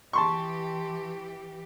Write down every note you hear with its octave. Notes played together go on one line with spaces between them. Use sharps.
E3 G4 A5 C6 C#6